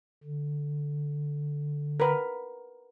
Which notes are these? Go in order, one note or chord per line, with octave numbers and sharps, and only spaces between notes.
D3
A#4 B4